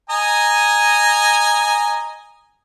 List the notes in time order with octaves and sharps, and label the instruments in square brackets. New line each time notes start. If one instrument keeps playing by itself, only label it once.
[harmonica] D#5 G#5 A#5